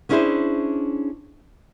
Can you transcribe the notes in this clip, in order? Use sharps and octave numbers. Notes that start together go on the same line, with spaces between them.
B3 C#4 D4 E4 G#4 C5